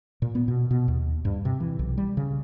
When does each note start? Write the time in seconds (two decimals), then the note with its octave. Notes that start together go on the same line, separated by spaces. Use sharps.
0.22 A#2
0.35 B3
0.48 B2
0.71 B2
0.88 D#2
1.25 G2
1.45 C3
1.60 E3
1.79 B1
1.98 G3
2.17 C#3